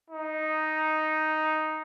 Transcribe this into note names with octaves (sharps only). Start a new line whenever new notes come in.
D#4